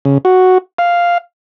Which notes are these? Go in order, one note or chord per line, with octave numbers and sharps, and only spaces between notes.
C#3
F#4
F5